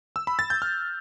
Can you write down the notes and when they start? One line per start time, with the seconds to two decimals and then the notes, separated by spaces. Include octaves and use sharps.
0.16 E6
0.27 B5
0.39 A6
0.50 G6
0.62 F6